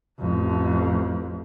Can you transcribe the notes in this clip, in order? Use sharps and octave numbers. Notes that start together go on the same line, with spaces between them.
A1 F2